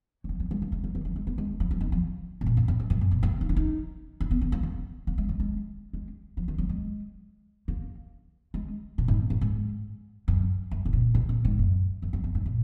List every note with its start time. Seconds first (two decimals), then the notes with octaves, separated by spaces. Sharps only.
0.24 F#3
0.29 F3
0.40 F#3
0.51 G#3
0.62 A#3
0.72 G#3
0.84 F#3
0.95 D#3
1.05 F#3
1.16 G#3
1.27 A#3
1.38 G#3
1.60 F#3
1.71 F3
1.81 D#3
1.92 F3
2.41 G#2
2.46 A#2
2.57 F#2
2.68 F#2
2.80 F2
2.90 F2
3.01 F#2
3.11 B2
3.23 A#3
3.41 D#4
3.49 D4
3.57 D#4
4.20 D4
4.31 B3
4.41 D3
4.52 A#3
4.63 B3
5.07 A#3
5.18 G#3
5.29 F#3
5.40 G#3
5.93 G#3
6.37 F3
6.48 D#3
6.58 F#3
6.69 G#3
7.68 A#3
8.54 G#3
8.98 B2
9.08 G#2
9.30 F#2
9.41 G#2
10.28 F#2
10.71 F#2
10.85 B2
10.93 A#2
11.15 B2
11.29 A#2
11.45 G#2
11.59 F#2
12.02 F#2
12.13 F2
12.24 F#2
12.35 G#2
12.46 A#2